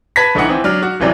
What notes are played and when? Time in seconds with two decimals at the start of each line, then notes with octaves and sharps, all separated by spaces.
0.16 B4 A5 B5 G#6 A#6 B6
0.35 A#1 D3 E3 D#4 F#5
0.49 E3 C4
0.64 F#3 D4 F6
0.82 F#4
1.00 G1 C3 E3 F#3 D5